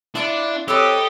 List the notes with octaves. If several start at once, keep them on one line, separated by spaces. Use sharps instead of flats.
B3 D4 E4 F4 D6
C4 D#4 G4 A4 B4 C#5 D#5